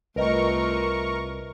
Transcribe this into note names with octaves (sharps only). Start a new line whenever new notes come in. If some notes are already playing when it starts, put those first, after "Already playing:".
C2 A3 F4 A#4 B4 D#5 G5 C#6